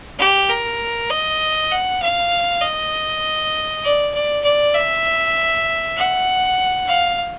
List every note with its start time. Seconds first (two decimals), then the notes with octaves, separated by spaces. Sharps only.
0.19 G4
0.49 A#4
1.10 D#5
1.72 F#5
2.02 F5
2.62 D#5
3.84 D5
4.14 D5
4.44 D5
4.75 E5
5.97 F#5
6.88 F5